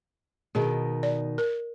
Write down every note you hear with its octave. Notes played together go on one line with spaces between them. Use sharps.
B2 D#3 G#4
D5
A#4